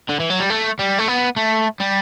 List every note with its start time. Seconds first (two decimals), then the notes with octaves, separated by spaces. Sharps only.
0.09 D3
0.20 E3
0.30 F#3
0.40 G3
0.50 A3
0.79 G3
0.99 A3
1.08 B3
1.36 A3
1.80 G3